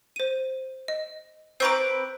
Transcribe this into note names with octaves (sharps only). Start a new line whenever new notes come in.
C5 D#7
D#5
C4 B4 A#5 C#6 D6 G6